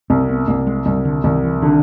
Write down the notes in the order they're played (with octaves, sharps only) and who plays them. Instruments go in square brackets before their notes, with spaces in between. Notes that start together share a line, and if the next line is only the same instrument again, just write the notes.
[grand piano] C2 [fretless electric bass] C4
[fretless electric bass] B3
[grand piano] C2 [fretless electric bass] A#3
[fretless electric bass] G#3
[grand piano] C2 [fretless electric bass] G3
[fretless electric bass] D3
[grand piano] C2 [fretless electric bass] D#3
[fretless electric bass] E3
[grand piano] D3 [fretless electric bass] D#3